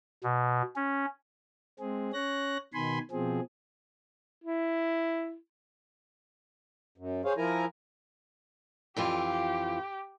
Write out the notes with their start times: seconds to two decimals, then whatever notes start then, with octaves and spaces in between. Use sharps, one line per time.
0.24 B2
0.76 C#4
1.80 G#3 C4 G#4
2.13 C#4 C#5 F#6 A#6
2.74 B2 D#3 G#5 B5 C6
3.11 B2 F3 C4 G#4
4.44 E4
6.98 F#2
7.25 G#4 C5 C#5 F5
7.37 F3 E4 A#4 G#5 A#5
8.97 F2 E3 F4 G4